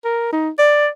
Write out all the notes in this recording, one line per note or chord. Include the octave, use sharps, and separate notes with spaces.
A#4
D#4
D5